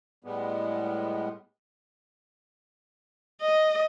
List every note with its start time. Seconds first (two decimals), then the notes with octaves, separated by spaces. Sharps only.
0.24 A2 G3 G#3 B3
3.41 D#5